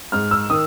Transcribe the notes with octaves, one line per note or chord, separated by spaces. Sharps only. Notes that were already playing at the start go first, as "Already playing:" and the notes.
G#2 F6
E6
D#3 D#6